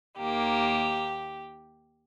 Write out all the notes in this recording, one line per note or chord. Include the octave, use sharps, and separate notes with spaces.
D#2 D#3 A#3 G4